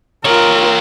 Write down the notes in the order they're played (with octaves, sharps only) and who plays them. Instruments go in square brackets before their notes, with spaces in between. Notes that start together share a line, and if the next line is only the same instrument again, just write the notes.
[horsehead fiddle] F4 A#4 [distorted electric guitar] G4 C#5